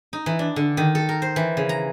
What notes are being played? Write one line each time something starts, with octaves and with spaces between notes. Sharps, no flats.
D#4
E3
D4
D3
D#3
A4
A#4
C5
E3
C#3
A#5